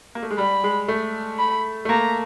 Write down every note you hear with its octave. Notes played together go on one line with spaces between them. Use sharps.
A#3
A3
G#3
G3 B5
G#3
A3
B5
A3
A#3 A#5